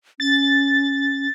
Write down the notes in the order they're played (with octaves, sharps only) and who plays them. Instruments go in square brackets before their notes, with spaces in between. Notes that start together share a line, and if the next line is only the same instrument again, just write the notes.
[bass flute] C#4 [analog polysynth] A6